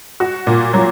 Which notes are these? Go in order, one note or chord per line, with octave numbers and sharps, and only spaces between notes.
F#4
A#2
F#3